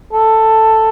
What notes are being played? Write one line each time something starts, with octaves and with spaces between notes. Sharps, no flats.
A4